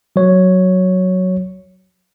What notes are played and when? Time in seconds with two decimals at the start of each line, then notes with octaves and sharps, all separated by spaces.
0.16 F#3 C#5